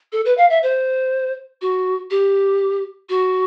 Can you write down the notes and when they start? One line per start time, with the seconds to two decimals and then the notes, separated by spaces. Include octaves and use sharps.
0.12 A4
0.25 B4
0.38 F5
0.50 E5
0.63 C5
1.62 F#4
2.11 G4
3.09 F#4